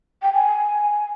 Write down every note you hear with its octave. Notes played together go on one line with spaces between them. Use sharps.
G5
G#5